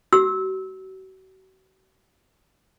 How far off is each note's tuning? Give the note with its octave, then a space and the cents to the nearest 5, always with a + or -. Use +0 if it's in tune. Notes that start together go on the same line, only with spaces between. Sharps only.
F#4 +40 E6 -20